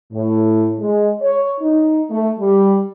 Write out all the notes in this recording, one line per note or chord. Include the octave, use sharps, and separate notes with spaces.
A2
G#3
C#5
D#4
A3
G3